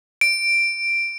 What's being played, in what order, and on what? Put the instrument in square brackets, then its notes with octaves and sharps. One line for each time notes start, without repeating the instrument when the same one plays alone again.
[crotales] D7